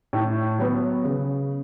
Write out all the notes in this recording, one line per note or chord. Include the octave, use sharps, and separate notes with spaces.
A2
F#3 B3
C#3